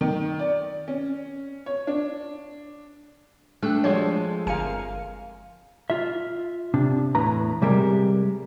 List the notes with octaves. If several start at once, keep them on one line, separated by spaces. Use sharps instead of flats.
D#3
D5
C#4
C#5
D4
A3 D4 G5 E6 F#6
F3 G3 G#3 F#4 C#5
G1 F2 A#4 F5 G#5 C#7
F4 E5
C3 D4
E2 A2 B4 A#5
C3 G3 G#3 G4 A#4